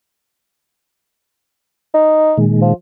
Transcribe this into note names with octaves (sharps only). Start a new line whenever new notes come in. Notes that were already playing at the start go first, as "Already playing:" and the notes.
D#4
A#2 D#3 G#3
F3